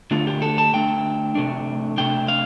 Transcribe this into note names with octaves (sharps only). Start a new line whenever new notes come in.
D3 A3 D4 F4
G4
A4
A5
D3 A3 D4 G5
C3 A3 D4
C3 A3 D4 G5
F5